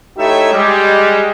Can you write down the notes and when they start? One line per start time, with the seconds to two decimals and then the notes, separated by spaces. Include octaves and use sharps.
0.17 A3 D#4 E4 G4 C#5 E5
0.53 G3 G#3